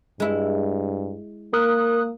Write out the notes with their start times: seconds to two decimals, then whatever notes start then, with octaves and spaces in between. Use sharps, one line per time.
0.20 G2 G#3 E4
1.53 A#3 A#4 D#6 F#6